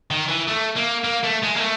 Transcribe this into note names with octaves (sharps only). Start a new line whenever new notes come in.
D#3
E3
A3
A#3
A#3
A3
G#3
A#3
A3